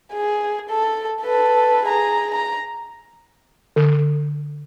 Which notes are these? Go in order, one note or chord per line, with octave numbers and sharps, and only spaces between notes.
G#4
A4
A4 B4
G#4 A#5
A#5
D3